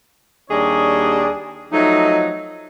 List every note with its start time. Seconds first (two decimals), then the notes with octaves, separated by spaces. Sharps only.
0.50 D#2 G3 D4 G#4 C#5 D#5
1.72 F3 F#3 A3 D#4